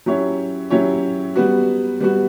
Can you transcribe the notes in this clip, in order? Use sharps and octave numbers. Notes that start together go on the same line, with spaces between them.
F#3 C#4 E4 G4 C#5
F#3 C#4 E4 G4 C#5
G3 B3 F#4
G3 B3 F#4